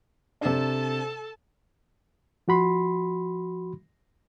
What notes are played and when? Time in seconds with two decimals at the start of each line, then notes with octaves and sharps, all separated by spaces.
0.41 C3 D4 A4 A5
2.48 F3 F#4 B5 C6